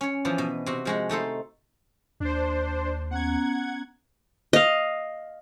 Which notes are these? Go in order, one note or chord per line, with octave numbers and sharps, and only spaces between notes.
C#4 C#5
E3 F3 B3 D4
B2
C3 F#4
F3 G#3 F#4
A3 D#4 A4 C5
D#2 D4 C5
B3 C#4 F#5 A#5 G#6
D#5 F5